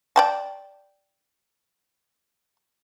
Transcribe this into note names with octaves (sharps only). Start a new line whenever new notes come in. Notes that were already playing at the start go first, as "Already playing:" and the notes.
D5 G5 A5